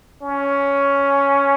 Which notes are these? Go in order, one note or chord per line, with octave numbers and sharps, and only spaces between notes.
C#4